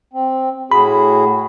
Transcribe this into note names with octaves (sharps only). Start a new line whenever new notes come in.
C4
A2 F#4 G#4 B5